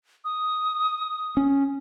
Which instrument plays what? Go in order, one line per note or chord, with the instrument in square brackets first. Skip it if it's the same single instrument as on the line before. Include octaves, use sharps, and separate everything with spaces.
[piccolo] D#6
[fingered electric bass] C#4